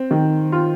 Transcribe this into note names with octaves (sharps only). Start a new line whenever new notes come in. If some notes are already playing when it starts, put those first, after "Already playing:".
Already playing: C4
D#3
F4